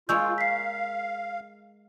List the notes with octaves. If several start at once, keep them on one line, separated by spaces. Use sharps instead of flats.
G#3 A#3 F4 C#5 C#6 E6 G6
F5 B6 C7